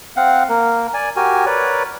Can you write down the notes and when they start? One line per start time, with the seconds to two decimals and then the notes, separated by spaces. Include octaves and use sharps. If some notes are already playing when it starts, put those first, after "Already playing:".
0.16 C4 F5 F#5
0.49 A#3 A#4
0.94 D5 G#5
1.16 F#4 G4 A#4 G#5
1.46 A#4 B4 C#5 D5